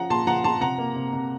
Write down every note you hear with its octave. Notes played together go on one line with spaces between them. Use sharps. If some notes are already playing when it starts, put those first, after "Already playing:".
Already playing: F3 C#4 F#5 A#5
A#2 A5 C6
F3 F#5 A#5
F3 A5 C6
C3 F#5 A#5
A#3
C3
C3